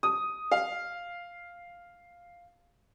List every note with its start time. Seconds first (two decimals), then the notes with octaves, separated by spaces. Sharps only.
0.03 D#6
0.52 F5